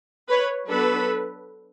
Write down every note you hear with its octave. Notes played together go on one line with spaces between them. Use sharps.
B4 C#5
F#3 B3 D4 A4 B4